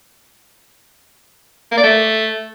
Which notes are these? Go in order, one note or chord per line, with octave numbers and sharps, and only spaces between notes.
A#3
D5
A3